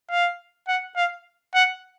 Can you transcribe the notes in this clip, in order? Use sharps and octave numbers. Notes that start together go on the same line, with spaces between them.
F5
F#5
F5
F#5